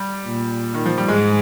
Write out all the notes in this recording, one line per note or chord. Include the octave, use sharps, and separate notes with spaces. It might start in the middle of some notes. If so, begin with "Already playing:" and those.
Already playing: G3
A#2
D#3
F3
G3
G#2 G#3